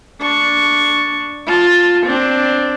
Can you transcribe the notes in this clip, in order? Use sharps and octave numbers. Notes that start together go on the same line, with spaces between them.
D4 C#6
F4 A5
C4 D4